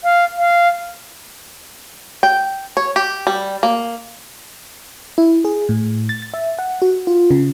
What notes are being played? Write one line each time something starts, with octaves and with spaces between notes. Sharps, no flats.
F5
F5
G5
C#5
G4
G3
A#3
E4
G#4
A2
A6
A6
E5
F#5
F#4
F4
C#3